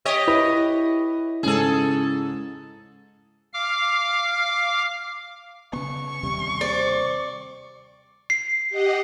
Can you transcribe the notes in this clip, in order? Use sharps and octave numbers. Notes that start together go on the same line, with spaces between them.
G4 C#5 D#5
E4 B4
G#2 C#3 G#4 A4
F5 D6 F6
C#3 B3 C#6
D#2 C3 G3
C4 D5
C7
G4 D#5 F#5